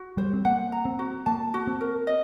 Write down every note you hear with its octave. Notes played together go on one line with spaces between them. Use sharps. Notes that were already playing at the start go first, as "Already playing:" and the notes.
Already playing: F#4
G3 C5
C4
A#3 F#5
A#5
C4
F#4
A#3 A5
F#4
C4
A#4
D#5